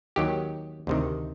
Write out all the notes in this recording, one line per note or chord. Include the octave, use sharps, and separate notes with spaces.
D#2 D#3 F#3 G4
D2 C3 D#3